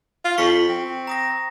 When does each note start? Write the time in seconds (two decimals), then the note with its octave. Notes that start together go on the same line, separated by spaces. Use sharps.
0.25 F4
0.38 F2 C#6 B6 C#7
0.69 C4
1.07 A#5 D#6 A#6